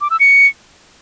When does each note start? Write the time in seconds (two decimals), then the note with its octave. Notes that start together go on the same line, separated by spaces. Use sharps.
0.01 D6
0.10 E6
0.20 C#7